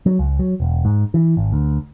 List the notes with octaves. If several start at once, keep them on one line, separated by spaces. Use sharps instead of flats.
F#3
C#2
F#3
E1
G#2
E3
G#1
D2